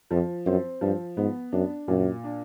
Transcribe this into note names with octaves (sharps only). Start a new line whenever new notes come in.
F2 F3
F#2 C4
G2 F3
G#2 B3
F#2 D4
F#2 A#2
D4